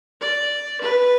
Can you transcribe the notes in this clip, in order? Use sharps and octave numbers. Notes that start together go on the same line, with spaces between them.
D5
B4